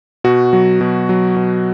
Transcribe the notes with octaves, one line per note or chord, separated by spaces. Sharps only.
B2 F#4
F#3
B2
F#3
B2